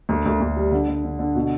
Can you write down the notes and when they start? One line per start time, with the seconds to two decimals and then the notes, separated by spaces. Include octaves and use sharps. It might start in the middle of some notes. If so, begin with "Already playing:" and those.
0.09 D2
0.26 D2
0.41 D2
0.57 G3
0.72 D3
0.88 D3
1.04 D3
1.19 D3
1.35 B2